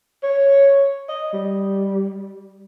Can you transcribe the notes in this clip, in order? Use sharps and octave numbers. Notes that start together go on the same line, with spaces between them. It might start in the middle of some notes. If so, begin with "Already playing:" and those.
C#5
D#5
G3